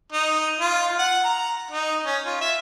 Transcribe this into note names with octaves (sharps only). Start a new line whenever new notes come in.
D#4
F4
F#5
A#5
D#4
C#4
F4
E5